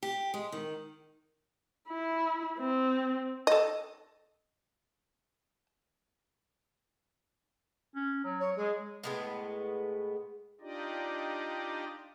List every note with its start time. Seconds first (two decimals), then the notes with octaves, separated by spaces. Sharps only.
0.03 G4
0.34 G#3
0.52 D#3
1.88 E4
2.59 C4
3.47 A4 D#5
7.95 C#4
8.24 F#3
8.40 C#5
8.56 G#3 G#4
9.04 A2 G#3 B3
10.61 D4 D#4 F4 G4 D5 D#5